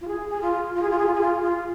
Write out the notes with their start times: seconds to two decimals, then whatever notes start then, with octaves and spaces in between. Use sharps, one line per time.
0.01 F4
0.08 G#4
0.29 G#4
0.41 F4
0.74 F4
0.82 G#4
0.90 F4
0.98 G#4
1.06 F4
1.13 G#4
1.21 F4
1.42 F4